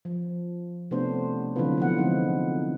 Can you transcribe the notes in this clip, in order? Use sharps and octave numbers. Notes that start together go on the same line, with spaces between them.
F3
C3 A3 B3 C#4 D4 C5
D3 E3 F#3 C4 F4 B4
F3 B3 F#5
D3 F3 G#3 C4 D#4